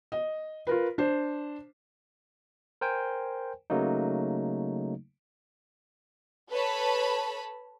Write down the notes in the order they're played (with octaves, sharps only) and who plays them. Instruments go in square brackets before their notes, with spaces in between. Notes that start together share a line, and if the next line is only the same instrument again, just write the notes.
[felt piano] D#5
F4 A#4 B4
D4 C5
[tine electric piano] A#4 C5 G5 G#5
C#3 F#3 A3 A#3 D#4
[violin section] A4 B4 C#5 A5 B5